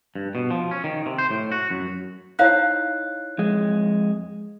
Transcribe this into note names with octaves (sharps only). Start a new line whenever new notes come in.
G2
B2
F3
C#4
D#3
C3
C5
A2
F#4
F#2
D#4 E4 C5 C#5 F5 F#6
F2 G#3